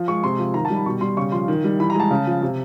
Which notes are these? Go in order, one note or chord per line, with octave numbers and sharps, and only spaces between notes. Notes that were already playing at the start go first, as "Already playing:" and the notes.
Already playing: F3
G#3 C#6
C3 C6
F3
D#3 A#5
A5
G3
B5
B2 C#6
G3 C6
C#3 C#6
F3 C6
D#3
G3
E3 B5
A#5
G#3 A5
C#3
F3
C3